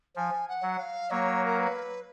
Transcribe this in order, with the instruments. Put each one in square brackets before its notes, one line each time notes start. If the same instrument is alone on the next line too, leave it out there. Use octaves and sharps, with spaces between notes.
[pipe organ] F3 [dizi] G#5
[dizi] F#5
[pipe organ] F#3
[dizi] F5
[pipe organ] F#3 A#3 [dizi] C#5
[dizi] A#4
B4